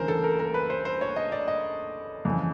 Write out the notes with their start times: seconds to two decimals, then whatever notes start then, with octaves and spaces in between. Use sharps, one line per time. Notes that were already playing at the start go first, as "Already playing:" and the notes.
Already playing: D2 C#3 E3 A#4 C5
0.08 A4
0.24 A#4
0.39 A#4
0.54 B4
0.70 C5
0.85 C5
1.01 C#5
1.16 D#5
1.32 D5
1.48 D#5
2.25 F2 C#3 E3